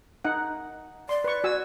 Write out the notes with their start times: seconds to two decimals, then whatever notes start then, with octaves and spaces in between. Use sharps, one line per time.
0.25 D#4 F#5
1.09 D5 C6
1.24 B4 C#6
1.44 F#4 G#5 E6